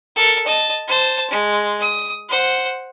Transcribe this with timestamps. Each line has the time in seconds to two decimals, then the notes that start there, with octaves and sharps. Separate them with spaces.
0.16 A4 A#4
0.46 D#5 A5
0.88 C5 A5
1.31 G#3
1.81 D#6
2.29 C5 F#5